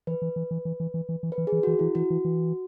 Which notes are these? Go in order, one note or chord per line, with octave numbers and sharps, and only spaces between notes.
E3 B4
E3
E3
E3
E3
E3
E3
E3
E3
B4
E3
G#4
E3
E3 F#4
E3 E4
E3 F#4
E3
E3